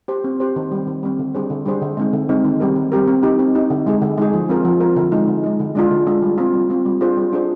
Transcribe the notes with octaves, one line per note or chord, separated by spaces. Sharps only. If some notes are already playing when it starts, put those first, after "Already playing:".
G4 C5
C4
G4 C5
D#3
G3 C4
D#3
G3 C4
D3
G3 D4 G#4 C5
D3
G3 D4 G#4 C5
D3
G#3 C4 D#4
D3
G#3 C4 D#4
D#3
G3 C4 G4 A#4
D#3
G3 C4 G4 A#4
C4
D#4 G4
C4
D#4 G4
D3
G#3 D#4 G#4
D3
G#3 D#4 G#4
F3
C4 F4 A#4
F3
C4 F4 A#4
D3
G#3 D#4
D3
G#3 D#4
D3
G#3 D4 F4
D3
G#3 D4 F4
G3
C4 F4
G3
C4 F4
G3
D4 F4 G#4 C5
G3
D4 F4 G#4 C5